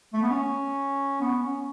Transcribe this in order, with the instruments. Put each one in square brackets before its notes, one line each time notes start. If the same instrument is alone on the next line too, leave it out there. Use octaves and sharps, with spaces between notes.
[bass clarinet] A3
B3
C#4
B3
C#4